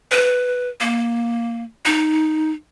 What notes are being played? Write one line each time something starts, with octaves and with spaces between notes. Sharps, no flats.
B4
A#3
D#4